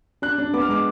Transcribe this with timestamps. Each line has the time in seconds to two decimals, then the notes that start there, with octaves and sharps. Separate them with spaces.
0.22 D4 F#6
0.38 D4
0.54 B3 D6
0.62 F6
0.69 G#3 D6